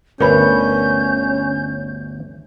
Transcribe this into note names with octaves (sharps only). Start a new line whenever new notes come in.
G1 D2 C#4 A#4 B4 C#5 B5 G6